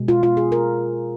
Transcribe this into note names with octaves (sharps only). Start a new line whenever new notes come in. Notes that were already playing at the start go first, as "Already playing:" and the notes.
Already playing: B2 G#3
F4
F4
G#4
A#4